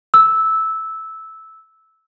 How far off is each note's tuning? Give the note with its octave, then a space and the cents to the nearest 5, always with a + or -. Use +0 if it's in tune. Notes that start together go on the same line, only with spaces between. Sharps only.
E6 -10